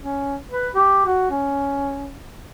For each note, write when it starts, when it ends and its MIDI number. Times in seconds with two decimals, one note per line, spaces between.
0.02 0.36 61
0.51 0.68 71
0.75 1.04 67
1.05 1.26 66
1.30 2.18 61